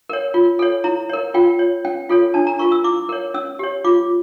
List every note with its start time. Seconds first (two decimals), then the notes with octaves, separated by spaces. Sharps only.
0.09 A#4 C#5
0.34 F4
0.59 A4 C#5
0.84 E4 A#5
1.09 A#4 C#5
1.34 F4 G5
1.59 C#5
1.85 C#4 G5
2.09 F4 A4 C#5
2.34 D4 A5
2.47 A#5
2.59 F4 A#4 C#6
2.72 E6
2.84 E4 D6
3.09 A#4 C#5
3.34 C#4 E6
3.59 G4 C#5
3.84 F4 D6